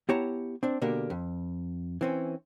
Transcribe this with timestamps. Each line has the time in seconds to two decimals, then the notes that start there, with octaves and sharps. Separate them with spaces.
0.09 B3 E4 G4 C#5 A5 A#5
0.63 C4 D4
0.81 B2 D3 A#3 G4 A#4
1.10 F2
2.01 E3 C4 C#4